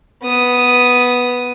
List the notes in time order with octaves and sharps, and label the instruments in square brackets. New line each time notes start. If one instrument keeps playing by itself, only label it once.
[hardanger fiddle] B3 D#6